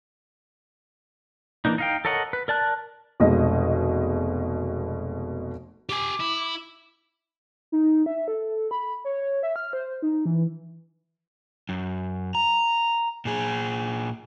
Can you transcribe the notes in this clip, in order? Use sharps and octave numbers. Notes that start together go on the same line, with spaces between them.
E3 A#3 D4 D#4
D#4 F5 G5
A4 A#4 C#5 D#5 F#5
B4
A#4 D5 A5 F#6
F1 B2 G#3 D#5
G4 G#5 D6
E4
D#4
E5
A4
B5
C#5
C#5
E5
F6
C5
D#4
E3
F#2
A#5
A#2 G#4